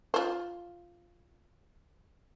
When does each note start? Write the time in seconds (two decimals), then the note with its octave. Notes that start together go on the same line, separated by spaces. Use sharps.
0.14 F4 C5